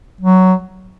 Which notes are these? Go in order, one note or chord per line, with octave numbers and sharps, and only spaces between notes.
F#3